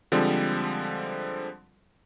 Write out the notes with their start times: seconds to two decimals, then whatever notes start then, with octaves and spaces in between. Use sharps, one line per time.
0.12 D3 F3 G3 G#3 C4